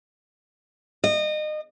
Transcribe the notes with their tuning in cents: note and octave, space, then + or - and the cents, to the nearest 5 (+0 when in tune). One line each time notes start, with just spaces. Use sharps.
D#5 -30